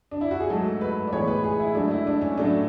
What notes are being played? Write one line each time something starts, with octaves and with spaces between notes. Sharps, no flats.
D4
E4
F#4
G#4
G#2 F#3 A3 A4
B4
D5
A2 E3 G#3 B3 C#5
B4
G#4
E4
G#2 F#3 A3 D4
E4
D4
C#4
A2 F#3 A3 D4